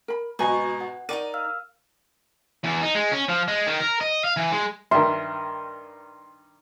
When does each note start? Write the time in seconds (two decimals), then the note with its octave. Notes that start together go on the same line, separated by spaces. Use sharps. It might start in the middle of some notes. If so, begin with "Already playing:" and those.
0.08 A#4 B5
0.39 G#1 B2 B4 D#5 G#5 A#5 B5 C#6
0.81 F#5
1.09 D#4 F#4 A#4 D5 D#7
1.34 F5 E6 F6
2.64 E2
2.83 D#4
2.95 G#3
3.12 C#4
3.29 F3
3.48 G#3
3.67 D#3
3.80 A#4
4.01 D#5
4.24 F5
4.37 E3
4.52 G#3
4.91 G2 D#3 E5 C6